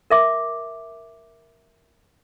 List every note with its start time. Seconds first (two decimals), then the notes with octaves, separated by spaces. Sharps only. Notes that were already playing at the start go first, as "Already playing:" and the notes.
0.10 A#4 E5 D6